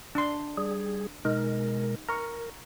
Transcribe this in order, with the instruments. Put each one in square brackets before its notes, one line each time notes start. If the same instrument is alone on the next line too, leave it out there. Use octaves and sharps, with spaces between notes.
[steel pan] D4 C6
[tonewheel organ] G3 G#4
[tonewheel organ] B2 G#3 A#4 [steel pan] D#4
[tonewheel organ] A#4 [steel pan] A#5 C#6